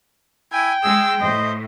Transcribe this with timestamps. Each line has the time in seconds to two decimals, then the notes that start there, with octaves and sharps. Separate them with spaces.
0.53 E4 G5 G#5
0.83 G#3 G#4 E6
1.21 A2 C5 D#5